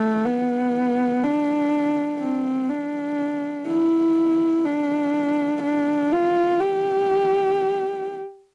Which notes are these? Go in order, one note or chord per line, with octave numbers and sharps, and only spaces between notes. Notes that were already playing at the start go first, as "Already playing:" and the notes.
Already playing: A3
B3
D4
C4
D4
E4
D4
D4
F4
G4